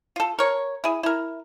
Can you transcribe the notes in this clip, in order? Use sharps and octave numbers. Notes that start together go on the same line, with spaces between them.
F4 A4
A#4 C#5
E4 G#4
E4 A#4